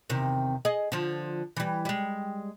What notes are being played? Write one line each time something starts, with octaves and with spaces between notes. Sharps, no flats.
E2 C3 D#3
G#4 D#5
D3 F3
E3 G3
G3 G#3